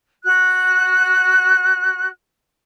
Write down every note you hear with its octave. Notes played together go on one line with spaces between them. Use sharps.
F#4 F#6